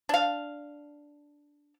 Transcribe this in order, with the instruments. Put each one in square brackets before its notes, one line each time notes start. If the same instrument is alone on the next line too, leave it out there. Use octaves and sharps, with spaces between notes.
[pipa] D4 F5